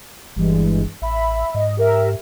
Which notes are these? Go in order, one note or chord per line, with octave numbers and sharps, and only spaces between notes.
G1 G2 E3 G#3
A1 E5 B5
G#2 D#5
G4 A#4 E5